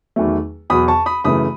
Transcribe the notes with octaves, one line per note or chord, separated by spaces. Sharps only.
E2 D#3 F#3 A3
E2 B2 F#3 B5 D#6
A5 C#6
B5 D#6
F#2 C#3 E3 A3 B5 D#6